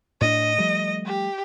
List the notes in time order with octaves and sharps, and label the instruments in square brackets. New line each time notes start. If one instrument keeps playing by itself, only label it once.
[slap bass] A2 D4 [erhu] D#5
[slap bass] F3 G3 A3
[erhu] G4